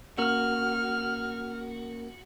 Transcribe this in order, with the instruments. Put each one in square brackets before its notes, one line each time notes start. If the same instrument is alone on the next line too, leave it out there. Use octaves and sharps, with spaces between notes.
[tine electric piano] A#3 C#4 A#4 [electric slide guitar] F#4 [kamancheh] F6